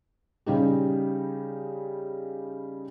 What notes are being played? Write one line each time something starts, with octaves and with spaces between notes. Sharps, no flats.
C#3 G3 D#4 G4